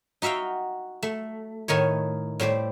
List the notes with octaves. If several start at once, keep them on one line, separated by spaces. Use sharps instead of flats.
D#4 F#4 E5 F5 G5
A3
A2 D#3 D#4 C#5
A2 G3 C5 D5